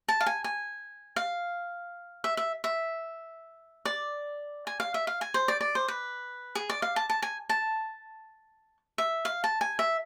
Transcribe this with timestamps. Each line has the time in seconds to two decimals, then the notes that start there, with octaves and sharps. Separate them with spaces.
0.08 A5
0.21 F5
0.26 G#5
0.44 G#5
1.16 F5
2.24 E5
2.37 E5
2.64 E5
3.85 D5
4.67 G#5
4.80 F5
4.94 E5
5.07 F5
5.21 G#5
5.34 C5
5.48 D5
5.61 D5
5.75 C5
5.88 B4
6.55 G#4
6.70 D5
6.82 F5
6.96 A5
7.10 A5
7.22 G#5
7.49 A5
8.98 E5
9.25 F5
9.44 A5
9.61 G#5
9.79 E5